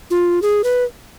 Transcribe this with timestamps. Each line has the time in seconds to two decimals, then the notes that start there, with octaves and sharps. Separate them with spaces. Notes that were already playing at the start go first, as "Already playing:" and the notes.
0.11 F4
0.42 G#4
0.64 B4